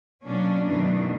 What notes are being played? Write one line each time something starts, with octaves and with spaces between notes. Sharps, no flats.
B2 F#3 A#3 C#4 D4
F#2 B2 D#3 E3 A3 D4